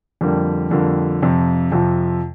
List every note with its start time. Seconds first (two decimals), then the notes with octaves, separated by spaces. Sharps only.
0.21 F2 D3 G3 A#3
0.71 F2 D3 G3 A#3
1.22 F2 C3 F3
1.72 F2 C3 F3